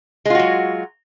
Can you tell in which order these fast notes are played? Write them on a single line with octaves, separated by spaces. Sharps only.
G#3 F4 F#4 F#3